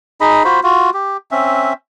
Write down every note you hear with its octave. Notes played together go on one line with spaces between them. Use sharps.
D#4 G#4 D#5 B5
F4 F#4 C5 B5
F4 F#4
G4
C4 C#4 E5